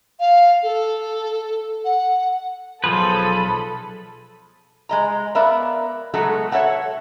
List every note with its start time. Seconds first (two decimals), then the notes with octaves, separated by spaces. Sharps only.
0.20 F5
0.63 A4
1.85 F#5
2.84 B1 F3 G#4 A4 B4 C5 B5
4.89 G#3 D#5 A#5
5.35 B3 A#4 D5 E5 F5
6.14 B2 F#3 G#3 A3 F#4 A4
6.51 A4 C#5 D#5 E5 F#5 A5